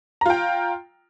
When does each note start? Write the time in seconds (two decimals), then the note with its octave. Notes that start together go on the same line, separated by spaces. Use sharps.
0.21 A#5
0.26 F4
0.30 G5